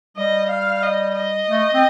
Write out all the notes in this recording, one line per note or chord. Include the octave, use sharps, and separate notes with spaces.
G3 D#5
F5
D#5
D#5
A3
C4